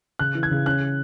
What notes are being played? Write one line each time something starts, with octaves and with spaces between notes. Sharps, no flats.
C#3 F#6
E3
G#6
C#3
C#4 F#6